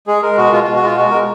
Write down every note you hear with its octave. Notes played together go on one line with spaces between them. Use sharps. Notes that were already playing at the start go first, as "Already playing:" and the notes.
G#3 G#4
G#3 A#4
B2 F#4
B2 F4
B2 F4
F#4
G#3 F4
G#3 F#4
G#3 A#4